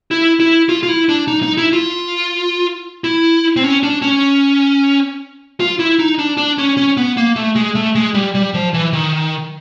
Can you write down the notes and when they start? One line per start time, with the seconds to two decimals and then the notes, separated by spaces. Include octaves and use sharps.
0.11 E4
0.40 E4
0.69 F4
0.83 F4
0.89 E4
1.09 D4
1.28 D#4
1.43 D#4
1.57 E4
1.73 F4
3.04 E4
3.56 C4
3.63 C#4
3.83 D4
4.02 C#4
5.60 F4
5.79 E4
5.99 D#4
6.19 D4
6.37 D4
6.58 C#4
6.77 C#4
6.97 B3
7.17 A#3
7.36 A3
7.56 G#3
7.75 A3
7.95 G#3
8.15 G3
8.35 G3
8.54 F3
8.74 E3
8.93 D#3